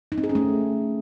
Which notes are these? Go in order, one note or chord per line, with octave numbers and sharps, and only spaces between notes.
D#4
C4
G#4
C#4
A3